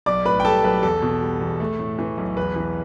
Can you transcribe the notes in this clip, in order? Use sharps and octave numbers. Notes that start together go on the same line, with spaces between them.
B1 D5 D6
A2 B4 B5
G5
G3 A4 A5
B1 B4
E2 A4
B2
G3
E2
A3
A2
E3
B1
E2 B4
E3